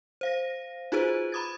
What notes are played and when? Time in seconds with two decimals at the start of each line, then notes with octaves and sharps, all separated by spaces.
0.21 C5 F5 A#6
0.92 D#4 F4 F#4 G#4 B4 C5
1.32 A#5 B5 D6 D#6 G#6 A6